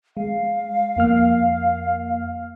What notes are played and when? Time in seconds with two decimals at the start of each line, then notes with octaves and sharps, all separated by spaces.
0.17 G#3 F5
0.97 F2 A#3 F6